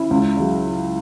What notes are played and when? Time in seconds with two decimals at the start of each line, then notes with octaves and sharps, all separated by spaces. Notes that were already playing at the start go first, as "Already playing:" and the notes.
Already playing: C#4 E4
0.11 C#2
0.37 C#3 F#3